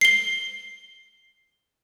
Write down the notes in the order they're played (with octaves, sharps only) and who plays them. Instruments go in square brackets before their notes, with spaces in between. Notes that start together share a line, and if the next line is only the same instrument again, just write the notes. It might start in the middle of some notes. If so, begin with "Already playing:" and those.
[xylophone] C7 G7